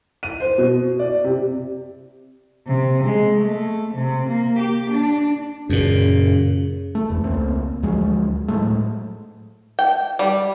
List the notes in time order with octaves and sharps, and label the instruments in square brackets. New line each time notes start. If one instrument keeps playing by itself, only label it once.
[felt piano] D#7
C5
B2
D5
C3
[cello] C3
G#3
A3
C3
A#3
G4
D4
[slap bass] F#2 A#2 [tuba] C#3
[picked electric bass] A3
F1 E2 E3
C#2 A3 A#3 C4
D2 F3 F#3 G#3
A2 F#3 G#3 A3
[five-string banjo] G5
G3